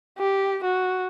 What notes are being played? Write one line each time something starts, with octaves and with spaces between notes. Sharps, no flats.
G4
F#4